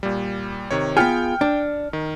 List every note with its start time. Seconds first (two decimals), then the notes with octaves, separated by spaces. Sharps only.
0.03 A#2 G3
0.71 C3 D#3 C#5
0.97 B3 F4 G#4 G5 F6 C#7
1.41 D4
1.93 D#3